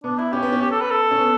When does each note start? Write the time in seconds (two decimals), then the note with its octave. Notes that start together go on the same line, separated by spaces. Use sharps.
0.04 B3 D4
0.19 E4
0.32 C#4 G4
0.43 B3
0.52 C#4
0.61 G4
0.71 A4
0.81 B4
0.91 A4
1.11 C#4
1.20 B3